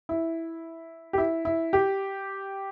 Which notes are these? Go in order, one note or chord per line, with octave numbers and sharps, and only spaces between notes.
E4
G4
E4
E4
G4